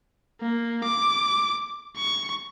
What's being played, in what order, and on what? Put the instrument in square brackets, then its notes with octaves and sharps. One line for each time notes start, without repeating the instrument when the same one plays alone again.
[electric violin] A#3
D6
C#6